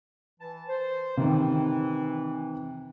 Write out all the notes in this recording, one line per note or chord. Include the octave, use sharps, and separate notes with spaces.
E3 A5
C5
C3 D#3 E3